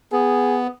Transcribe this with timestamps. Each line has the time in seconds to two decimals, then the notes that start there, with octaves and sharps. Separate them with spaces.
0.12 B3 G#4